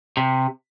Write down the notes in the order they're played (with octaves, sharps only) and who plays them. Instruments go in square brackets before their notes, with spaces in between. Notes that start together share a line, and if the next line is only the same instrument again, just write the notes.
[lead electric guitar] C3